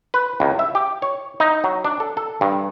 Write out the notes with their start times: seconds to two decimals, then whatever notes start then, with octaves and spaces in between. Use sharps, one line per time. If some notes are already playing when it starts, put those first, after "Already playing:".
0.14 B4
0.40 C#2
0.59 E5
0.75 G4
1.02 C#5
1.40 D#4
1.64 F#3
1.85 D4
2.00 A4
2.17 A4
2.41 G2